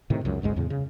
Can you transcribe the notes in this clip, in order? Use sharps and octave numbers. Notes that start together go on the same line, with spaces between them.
A2 C3 D#3
C#2 F#2
G#1 D2 G#2 G#3
E2 A2 C#3
C#3